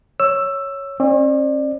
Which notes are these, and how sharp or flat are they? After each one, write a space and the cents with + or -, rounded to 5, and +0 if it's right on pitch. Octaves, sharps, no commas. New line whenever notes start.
C#5 +0 E6 +10
C#4 -45 D5 +30